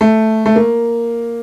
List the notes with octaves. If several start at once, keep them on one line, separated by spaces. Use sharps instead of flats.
A3
A3
A#3